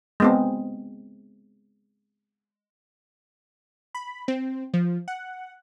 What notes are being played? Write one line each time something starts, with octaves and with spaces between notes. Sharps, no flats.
G#3 B3 C4
B5
C4
F3
F#5